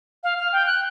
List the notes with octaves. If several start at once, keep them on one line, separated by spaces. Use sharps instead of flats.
F5
F6
G5
F#6